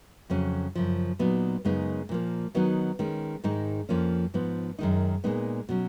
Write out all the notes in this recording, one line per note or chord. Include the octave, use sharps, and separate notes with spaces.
F2 C#3 F#3 C#4
F#2 C#3 F3
A#2 F#3 B3 D#4
F#2 C#3 G#3 B3 D#4
A#2 F3 A#3
D#3 F#3 B3 D#4
D#3 G#3 C#4
G#2 D#3 G#3 D#4
F2 F3 A#3 C#4
G#2 F3 B3
F#2 D#3 G#3 D#4
A#2 G#3 B3 D#4
B2 F#3 C#4